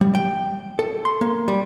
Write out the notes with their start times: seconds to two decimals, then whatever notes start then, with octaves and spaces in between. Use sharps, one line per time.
0.01 G3
0.15 G5
0.79 A4
1.05 C6
1.21 A#3
1.48 G3